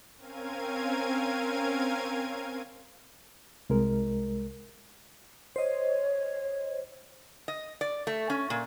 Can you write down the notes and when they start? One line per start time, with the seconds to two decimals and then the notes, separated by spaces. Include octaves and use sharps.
0.16 C4 C#4 A#4 F5 G#6 D#7
3.70 C2 G#3 A#4
5.56 C5 C#5 D#5
7.48 D#5
7.81 D5
8.07 A3
8.30 C#4
8.50 A#2